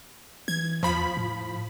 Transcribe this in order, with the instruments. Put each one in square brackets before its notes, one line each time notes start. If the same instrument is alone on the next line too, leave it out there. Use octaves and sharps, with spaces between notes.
[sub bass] E3 [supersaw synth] G#6
[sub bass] E2 [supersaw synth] F3 B5
[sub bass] A2